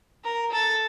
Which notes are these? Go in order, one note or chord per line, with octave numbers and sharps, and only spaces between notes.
A#4
A4